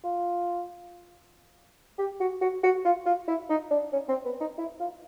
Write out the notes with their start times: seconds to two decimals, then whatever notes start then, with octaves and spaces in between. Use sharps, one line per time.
0.04 F4
1.98 G4
2.20 F#4
2.41 F#4
2.63 F#4
2.85 F4
3.06 F4
3.28 E4
3.50 D#4
3.71 D4
3.92 C#4
4.09 C4
4.25 B3
4.41 D#4
4.58 E4
4.80 F4